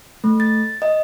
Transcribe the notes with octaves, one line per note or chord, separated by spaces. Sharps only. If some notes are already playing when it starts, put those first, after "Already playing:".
A3
A6
D#5